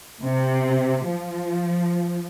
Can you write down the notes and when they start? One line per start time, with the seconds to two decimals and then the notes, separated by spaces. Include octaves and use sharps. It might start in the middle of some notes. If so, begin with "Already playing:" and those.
0.22 C3
1.08 F3